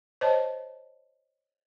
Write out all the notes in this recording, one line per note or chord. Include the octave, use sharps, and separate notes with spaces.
C5 C#5 D#5 A5